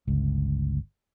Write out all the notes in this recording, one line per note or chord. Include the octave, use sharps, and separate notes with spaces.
G1 C#2